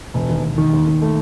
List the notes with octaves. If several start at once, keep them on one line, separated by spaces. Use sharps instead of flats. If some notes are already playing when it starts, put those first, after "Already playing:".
E1
D#2
E1
D#3
D#2
D#3
A3